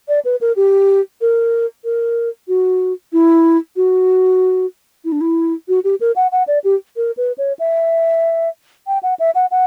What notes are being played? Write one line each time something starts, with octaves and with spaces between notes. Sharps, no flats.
D5
B4
A#4
G4
A#4
A#4
F#4
E4
F#4
E4
D4
E4
F#4
G4
A#4
F#5
F#5
D5
G4
A#4
B4
C#5
E5
G5
F#5
E5
F#5
F#5